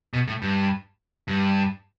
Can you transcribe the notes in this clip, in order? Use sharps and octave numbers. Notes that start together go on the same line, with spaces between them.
B2
A2
G2
G2